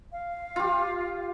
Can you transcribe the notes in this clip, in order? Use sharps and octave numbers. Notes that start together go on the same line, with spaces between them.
F5
F4 G4